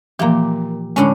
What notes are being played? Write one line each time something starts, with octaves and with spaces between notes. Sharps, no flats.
A#2 E3 F3 A#3 G4
A2 D3 G#3 C#4